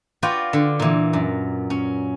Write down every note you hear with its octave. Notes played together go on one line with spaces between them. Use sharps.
F4 F#4 B4 D5 G5
D3
A#2 E3
F#2
C#4